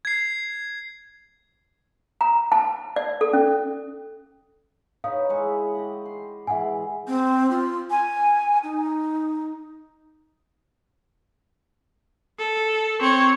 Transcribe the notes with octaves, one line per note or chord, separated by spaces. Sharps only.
G#6 C7
A#5
A5
D5
A4
C#4
D#4 B4 C#5 F5 D#6
G#3 E4 C#6
G4 D#5 F#5
C6
E3 G#3 G#4 E5 F#5 G#5
C4
F4
G#5
D#4
A4
C4 C#5